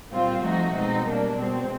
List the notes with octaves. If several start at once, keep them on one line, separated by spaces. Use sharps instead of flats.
A#2 G3 C4 F4
F3 A3 C4 D#4 F#4
B2 G#3 C4 D#4
G3 A#3 D4
B2 G#3 C4